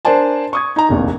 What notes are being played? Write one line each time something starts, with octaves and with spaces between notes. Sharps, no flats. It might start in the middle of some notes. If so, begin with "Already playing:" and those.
D4 A#4 C5 D5 G#5 A5
C#6 D#6 G#6
D#4 A#5
F1 A#1 D#2